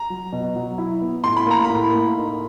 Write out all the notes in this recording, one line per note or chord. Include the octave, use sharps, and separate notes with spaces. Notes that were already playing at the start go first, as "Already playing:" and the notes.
Already playing: A#5
F#3
B2
F#3
E4
B3
A2 C6
B5
A#3 A#5
B5
A2
A#3
D#4